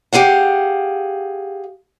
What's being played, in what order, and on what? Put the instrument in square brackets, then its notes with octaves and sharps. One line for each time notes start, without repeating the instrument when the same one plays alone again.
[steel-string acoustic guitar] G4 G#4 F5 F#5